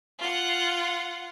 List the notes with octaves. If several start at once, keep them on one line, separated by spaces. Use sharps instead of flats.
F4 F#5